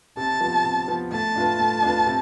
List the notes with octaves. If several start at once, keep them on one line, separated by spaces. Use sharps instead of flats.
C3 A5
F3 B3
C3
F3 B3
A3 A5
D4 F4 B4
A3
D4 F4 B4
C3